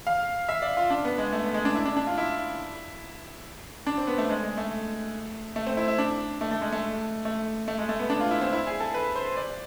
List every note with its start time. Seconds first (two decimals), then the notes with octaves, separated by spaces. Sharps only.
0.07 F5
0.49 E5
0.62 D5
0.77 F4
0.90 D4
1.05 B3
1.18 G#3
1.33 A3
1.43 B3
1.54 G#3
1.65 D4
1.75 E4
1.85 D4
1.97 D4
2.07 F4
2.18 E4
3.87 D4
3.98 C4
4.07 B3
4.18 A3
4.29 G#3
4.43 G#3
4.57 A3
5.56 A3
5.67 C4
5.77 E4
5.88 E4
5.98 D4
6.41 A3
6.51 A3
6.61 G#3
6.73 A3
7.25 A3
7.68 A3
7.78 G#3
7.89 A3
7.99 B3
8.10 D4
8.20 F4
8.31 E4
8.41 C4
8.53 E4
8.67 G#4
8.80 A4
8.94 B4
9.16 C5
9.37 D5